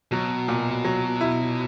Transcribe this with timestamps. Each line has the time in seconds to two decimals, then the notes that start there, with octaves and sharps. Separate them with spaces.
0.12 B2 F#3
0.48 A#2
0.85 F#3
1.21 E4